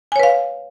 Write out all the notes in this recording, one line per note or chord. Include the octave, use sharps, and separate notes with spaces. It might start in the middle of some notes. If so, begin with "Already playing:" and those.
B4 C#5 F5 G#5